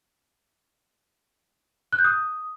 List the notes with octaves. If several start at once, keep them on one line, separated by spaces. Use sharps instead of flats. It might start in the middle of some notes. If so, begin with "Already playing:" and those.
F#6
G6
D#6